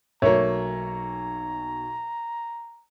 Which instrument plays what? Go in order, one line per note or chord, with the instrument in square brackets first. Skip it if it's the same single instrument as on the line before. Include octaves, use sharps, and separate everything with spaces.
[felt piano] B1 F#3 [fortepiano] A3 A#3 [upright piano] C#5 [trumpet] A#5